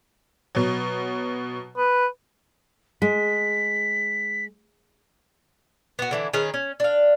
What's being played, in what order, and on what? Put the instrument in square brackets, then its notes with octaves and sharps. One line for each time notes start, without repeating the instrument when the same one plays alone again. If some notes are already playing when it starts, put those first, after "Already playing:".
[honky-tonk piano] B2 F#3
[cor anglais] B4
[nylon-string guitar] G#3 [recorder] B6
[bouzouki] B3 F#4
D3 E3 E4
D#3 C#4 G#4 B4
C#4
D4 F5